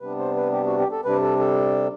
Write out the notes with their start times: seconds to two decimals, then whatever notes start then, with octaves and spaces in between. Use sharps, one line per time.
0.01 C3 G3 B3 D4 B4
0.19 C5
0.36 B4
0.52 G4
0.66 F#4
0.79 G4
0.92 A4
1.05 C3 G3 D4 B4
1.22 A4
1.39 A4